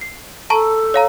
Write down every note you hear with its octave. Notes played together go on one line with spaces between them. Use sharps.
C7
A4 A5 A#5 C#6
C#5 F5 A#5